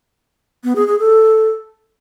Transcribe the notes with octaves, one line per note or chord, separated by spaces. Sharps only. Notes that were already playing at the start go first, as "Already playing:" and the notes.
B3
G#4
G#4
A4